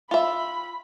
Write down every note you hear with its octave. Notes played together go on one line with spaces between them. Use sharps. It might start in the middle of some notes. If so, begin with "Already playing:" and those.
F4 E5 B5